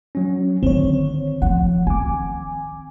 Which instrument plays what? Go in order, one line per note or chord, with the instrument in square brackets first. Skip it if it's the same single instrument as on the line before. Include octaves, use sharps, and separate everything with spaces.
[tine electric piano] F#3 C#4
[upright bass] D3 [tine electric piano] D#3 [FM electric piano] C4 C#5
[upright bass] F3 [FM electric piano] F#5
[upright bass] C4 [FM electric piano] G#5 D6